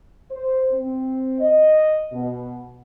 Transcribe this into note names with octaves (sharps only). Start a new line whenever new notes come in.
C5
C4
D#5
B2